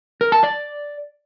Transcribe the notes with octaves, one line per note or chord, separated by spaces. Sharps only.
A#4
A5
D5